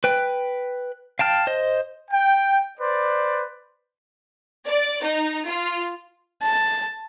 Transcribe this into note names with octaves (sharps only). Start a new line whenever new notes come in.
B4 G5
F5 G5 A5 F6
C5 D#5
G5
B4 C5 D5
D5
D#4
F4
A5